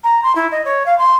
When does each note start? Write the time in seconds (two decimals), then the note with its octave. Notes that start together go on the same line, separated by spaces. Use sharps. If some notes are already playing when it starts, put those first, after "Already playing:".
0.03 A#5
0.23 C6
0.35 E4
0.51 D#5
0.65 C#5
0.86 F5
0.98 C6